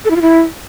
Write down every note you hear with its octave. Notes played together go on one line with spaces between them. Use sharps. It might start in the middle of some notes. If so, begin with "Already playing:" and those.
A4
E4
F4
E4